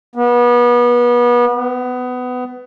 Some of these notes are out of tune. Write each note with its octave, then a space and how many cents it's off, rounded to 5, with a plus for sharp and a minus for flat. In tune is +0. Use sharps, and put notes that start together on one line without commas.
B3 -30
B3 +20